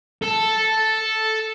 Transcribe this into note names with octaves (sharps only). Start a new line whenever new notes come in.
A4 A5